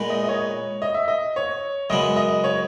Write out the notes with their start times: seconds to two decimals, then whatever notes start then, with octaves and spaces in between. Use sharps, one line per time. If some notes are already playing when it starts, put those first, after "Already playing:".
Already playing: A#2 G#3 B3 D#4 A#4
0.10 D#5
0.24 D#5
0.29 C#5
0.82 D#5
0.94 E5
1.08 D#5
1.36 C#5
1.90 F#2 C#3 G#3 B3 D#5
2.16 D#5
2.44 C#5